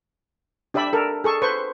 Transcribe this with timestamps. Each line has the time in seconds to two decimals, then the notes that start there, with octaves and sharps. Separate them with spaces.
0.74 D4 G4 D5 E5 B5
0.93 A4 A#4
1.24 G#4 A4 C#6
1.42 B4 C5 C#6